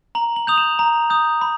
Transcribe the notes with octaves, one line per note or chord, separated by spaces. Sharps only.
A#5 F#7
F#7
D#6 G6 F7
E7
A#5
D#6 G6
B5